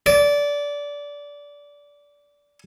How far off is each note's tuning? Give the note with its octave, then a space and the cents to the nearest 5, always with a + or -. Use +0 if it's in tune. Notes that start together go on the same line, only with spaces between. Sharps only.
D5 -20